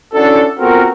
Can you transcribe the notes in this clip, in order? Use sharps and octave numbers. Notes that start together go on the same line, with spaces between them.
C#4 D4 E4 F#4 A4
B3 C4 F4 F#4 A4 A#4